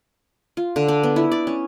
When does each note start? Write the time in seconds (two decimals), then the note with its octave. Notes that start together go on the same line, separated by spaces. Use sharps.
0.57 F4
0.76 D3
0.88 D4
1.03 B3
1.16 E4
1.32 D5
1.47 C#4